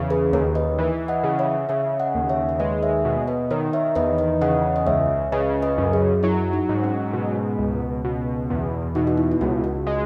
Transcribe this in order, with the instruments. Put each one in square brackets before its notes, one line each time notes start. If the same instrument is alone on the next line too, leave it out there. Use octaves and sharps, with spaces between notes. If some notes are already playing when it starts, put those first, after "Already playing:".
Already playing: [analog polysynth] E2 C#3
[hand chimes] G#4 B4
[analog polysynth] D#2 [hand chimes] A#4 C#5
[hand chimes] B4 D#5
[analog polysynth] E3
[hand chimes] D#5 F#5
[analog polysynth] C#3
[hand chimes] C#5 E5
[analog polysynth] C#3 [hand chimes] C#5 E5
[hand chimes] D#5 F#5
[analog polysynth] D#2
[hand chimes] C#5 E5
C#5
[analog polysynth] G#3 [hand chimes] B4 D#5
[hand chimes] C#5 E5
[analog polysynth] B2
[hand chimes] B4 D#5
[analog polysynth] D#3 [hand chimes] A#4 C#5
[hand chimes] C#5 E5
[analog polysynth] E2 [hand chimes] B4 D#5
[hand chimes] B4 D#5
[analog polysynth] C#3 [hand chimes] D#5 F#5
[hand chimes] D#5
[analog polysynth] C#2 [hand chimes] C#5 E5
[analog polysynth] C#3 [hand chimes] B4 D#5
[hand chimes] B4 D#5
[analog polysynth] F#2
[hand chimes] G#4
[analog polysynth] F#3 [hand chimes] E4
[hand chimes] D#4
[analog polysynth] G#2
[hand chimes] C#4
[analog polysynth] B2
C#2
B2
E2
[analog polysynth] B2 [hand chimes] D#4
[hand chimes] F#4
E4
E4
[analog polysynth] C#2 [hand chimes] F#4
[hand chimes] F#4
[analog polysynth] G#3